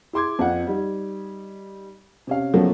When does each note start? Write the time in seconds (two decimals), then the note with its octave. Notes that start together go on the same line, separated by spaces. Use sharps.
0.13 E4 G#4 C6 D6 G#6
0.39 F2 F4 F#5
0.67 G3 D#4
2.27 C3 C#4 F5
2.54 B1 C#3 F3 F#3 A3 A#3